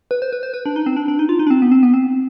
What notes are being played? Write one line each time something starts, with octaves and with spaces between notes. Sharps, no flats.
B4
C5
B4
C5
B4
D4
D#4
C4
D4
D4
D#4
F4
D#4
D4
C4
B3
C4
B3
C4